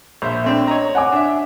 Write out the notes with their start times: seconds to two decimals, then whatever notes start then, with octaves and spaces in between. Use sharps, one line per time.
0.22 A#1 C5 E5
0.44 A3 C4 D4
0.68 C#5 D#5 A#5
0.95 F#5 G#5 D6
1.12 D4 E5